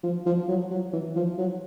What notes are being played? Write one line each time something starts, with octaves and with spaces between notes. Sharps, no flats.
F3
F3
F#3
F#3
E3
F3
F#3